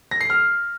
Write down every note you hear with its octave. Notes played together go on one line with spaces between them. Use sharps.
A#6
C7
F6